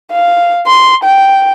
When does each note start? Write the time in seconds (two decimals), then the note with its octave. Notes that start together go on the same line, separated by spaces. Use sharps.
0.12 F5
0.67 C6
1.04 G5